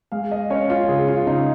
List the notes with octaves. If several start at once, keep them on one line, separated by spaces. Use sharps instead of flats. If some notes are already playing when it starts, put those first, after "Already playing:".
G#3 F5
D#5
C#4 C#5
F4
C#3 G#4
F4
C#3 D#4